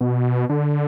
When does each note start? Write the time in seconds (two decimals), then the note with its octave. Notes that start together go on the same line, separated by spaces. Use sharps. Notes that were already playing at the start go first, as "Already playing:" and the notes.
0.01 B2
0.49 D3